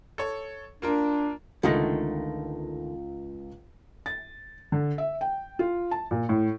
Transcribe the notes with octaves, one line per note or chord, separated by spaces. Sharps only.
A4 C#5
A#3 D4 F4 A#4
C#2 D3 D#3 A3 A#6
A6
D3
E5
G5
F4
A5
A#2
A2